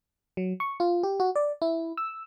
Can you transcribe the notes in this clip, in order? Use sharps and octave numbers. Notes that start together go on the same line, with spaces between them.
F#3
C#6
F4
G4
F#4
D5
E4
E6